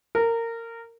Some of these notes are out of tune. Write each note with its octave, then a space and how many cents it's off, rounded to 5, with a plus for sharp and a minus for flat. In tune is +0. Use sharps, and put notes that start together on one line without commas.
A#4 -20